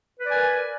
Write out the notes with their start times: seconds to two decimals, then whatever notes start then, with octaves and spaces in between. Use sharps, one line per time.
0.20 B4
0.24 D5
0.28 G#5
0.32 A#4